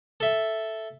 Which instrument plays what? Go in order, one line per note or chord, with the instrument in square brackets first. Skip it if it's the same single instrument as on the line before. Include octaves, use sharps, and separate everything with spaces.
[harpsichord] A4 E5